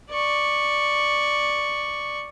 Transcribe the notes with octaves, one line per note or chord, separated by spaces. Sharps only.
D5 C#6